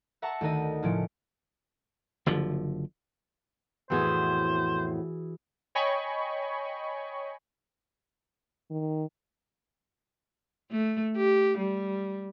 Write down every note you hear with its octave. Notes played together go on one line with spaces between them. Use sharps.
E5 F#5 A5 A#5 C#6
D2 D#3 D#4 D#5
A2 C#3 F3 C#4 D7
F#1 D3 F3
F2 A2 E3 B3 F#4 G#4 C5
C#5 D#5 G5 G#5 B5 C#6
D#3
A3
G4
G3